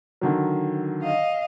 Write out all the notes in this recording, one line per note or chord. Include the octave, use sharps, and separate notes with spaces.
D3 D#3 F#3
D#5 F5